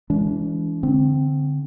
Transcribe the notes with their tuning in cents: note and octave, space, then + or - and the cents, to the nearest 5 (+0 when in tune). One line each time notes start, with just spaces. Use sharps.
E3 +0 G#3 -5 D4 -40
D3 -10 C4 +0